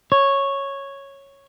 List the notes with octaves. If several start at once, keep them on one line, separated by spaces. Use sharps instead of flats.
C#5